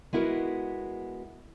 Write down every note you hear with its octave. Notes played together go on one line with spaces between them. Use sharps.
G#3 B3 E4 F#4 A#4